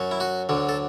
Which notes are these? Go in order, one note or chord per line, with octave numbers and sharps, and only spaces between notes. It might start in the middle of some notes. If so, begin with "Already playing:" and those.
Already playing: F#2 F#3
E4
F#4
D2 D3 F#3
A4